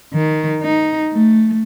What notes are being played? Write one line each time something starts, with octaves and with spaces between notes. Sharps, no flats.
D#3
D#4
A3